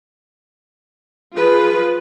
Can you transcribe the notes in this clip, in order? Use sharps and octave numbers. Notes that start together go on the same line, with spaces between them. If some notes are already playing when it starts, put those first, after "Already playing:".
F3 F4 G#4 B4